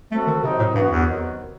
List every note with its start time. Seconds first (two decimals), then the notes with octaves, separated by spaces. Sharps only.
0.11 F#3 A3 C4 F#4 A4
0.27 D#3
0.43 C3 D#3 F#3 C4 D#4
0.59 A2
0.75 G2 C3 E3 B3 F#4
0.91 E2
1.06 C3 D#3 F#3 B3